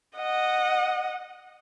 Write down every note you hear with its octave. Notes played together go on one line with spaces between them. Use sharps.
D#5 F#5